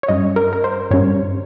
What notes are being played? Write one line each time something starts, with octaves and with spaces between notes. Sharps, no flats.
C#5
G2 G3 C#4 D#5
A#4
A#4
C5
G2 G3 C#4 C#5